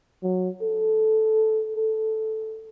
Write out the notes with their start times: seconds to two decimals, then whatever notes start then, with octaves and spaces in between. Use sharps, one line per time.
0.23 F#3
0.62 A4
1.76 A4